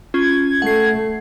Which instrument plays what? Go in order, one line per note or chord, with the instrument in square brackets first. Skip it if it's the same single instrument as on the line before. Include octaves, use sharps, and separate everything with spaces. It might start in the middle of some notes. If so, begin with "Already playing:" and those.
[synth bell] C#4 F4 [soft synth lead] G#6
[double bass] A3 [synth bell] F#5 C7